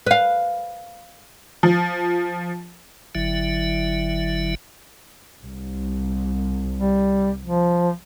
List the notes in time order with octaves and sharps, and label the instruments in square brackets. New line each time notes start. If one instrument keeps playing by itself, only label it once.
[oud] B4 F5
[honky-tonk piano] F3
[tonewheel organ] G1 D3 F#3 E4 E5
[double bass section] C2
[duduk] G3
F3